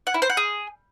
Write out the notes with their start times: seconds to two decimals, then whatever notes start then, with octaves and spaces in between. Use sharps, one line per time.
0.07 F#5
0.14 E4
0.22 C5
0.30 F#5
0.37 G#4